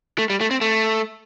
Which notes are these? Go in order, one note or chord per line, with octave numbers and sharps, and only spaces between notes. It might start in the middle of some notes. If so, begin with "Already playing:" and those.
A3
G3
A3
C4
A3